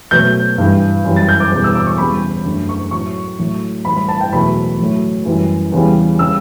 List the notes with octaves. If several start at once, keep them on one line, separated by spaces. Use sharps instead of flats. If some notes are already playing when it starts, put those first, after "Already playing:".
B2 F#3 A3 G6
G2 E3 G3
F#2 E3 G3
A6
G6
D6
E2 B2 G3
E6
D6
C#6
E2 C#3 G3 B5
F#2 D3 A3
C#6
A2 F#3 A3 C#6
A2 F#3 A3
A2 E3 G3 B5
B5
A5
G5
E2 B2 F#3 A3 B5
A2 F#3 A3
F#2 E3 G3
E2 C#3 E3 G3
C#3 G3 E6